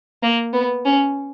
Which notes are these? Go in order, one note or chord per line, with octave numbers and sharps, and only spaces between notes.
A#3
B3
C#4